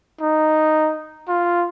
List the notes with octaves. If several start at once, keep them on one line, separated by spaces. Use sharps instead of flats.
D#4
F4